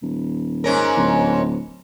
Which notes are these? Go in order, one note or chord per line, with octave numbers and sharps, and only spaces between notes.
D#1
G#2 C#4 A#4
D1